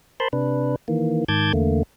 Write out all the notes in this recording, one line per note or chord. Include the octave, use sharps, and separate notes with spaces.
A#4 C5 A5 B5 C6
C3 D4 B4
D#3 E3 A#3
G#2 D#3 A5 D6 G6 G#6
E2 D3 A3 A#3